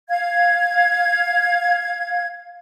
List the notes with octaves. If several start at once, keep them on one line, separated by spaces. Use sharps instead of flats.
F5 G#6